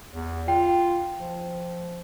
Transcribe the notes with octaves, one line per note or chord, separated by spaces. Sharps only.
E2
F4 G5
F3